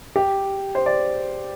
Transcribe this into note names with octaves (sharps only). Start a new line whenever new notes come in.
G4
C5
D5